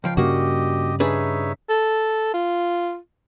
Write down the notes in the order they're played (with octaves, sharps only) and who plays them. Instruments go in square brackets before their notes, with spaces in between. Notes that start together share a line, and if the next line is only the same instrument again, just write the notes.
[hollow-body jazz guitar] C#2 F3 [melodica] F5 G5
[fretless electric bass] G2 C#3 G3 [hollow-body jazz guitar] A#3 F#4 [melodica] G4 D#5
[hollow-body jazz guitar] D4 G#4 B4 [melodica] D#4 C#5 E5
[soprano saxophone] A4
F4